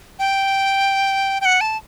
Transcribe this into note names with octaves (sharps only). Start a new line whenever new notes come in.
G5
G5
F#5
A5